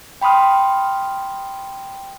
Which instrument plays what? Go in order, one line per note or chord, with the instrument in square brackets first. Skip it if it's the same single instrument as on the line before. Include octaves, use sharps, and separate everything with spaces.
[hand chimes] G5 B5 C6 D#6 F6